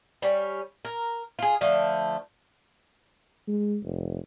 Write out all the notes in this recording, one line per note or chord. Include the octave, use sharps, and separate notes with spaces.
G3 C#4
A#4
F4 G#4
D3 F3 A3
G#3
F1